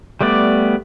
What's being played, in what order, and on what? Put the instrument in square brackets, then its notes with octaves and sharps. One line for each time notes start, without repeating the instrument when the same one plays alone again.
[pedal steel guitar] G3 A3 B3 D5